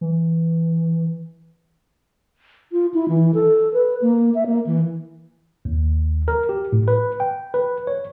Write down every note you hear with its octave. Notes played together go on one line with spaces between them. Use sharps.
E3
F4
E4
E3
A4
B4
A#3
E5
A#3
E3
D#2
A#4
G4
A2
B4
G5
B4
C#5